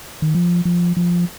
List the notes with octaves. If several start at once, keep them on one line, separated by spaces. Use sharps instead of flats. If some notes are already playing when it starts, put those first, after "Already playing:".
D#3
F3
F3
F3